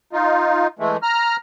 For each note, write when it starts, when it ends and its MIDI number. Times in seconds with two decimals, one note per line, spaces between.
0.13 0.67 63
0.13 0.67 65
0.79 0.97 52
0.79 0.97 56
0.79 0.97 57
1.03 1.36 82
1.03 1.36 89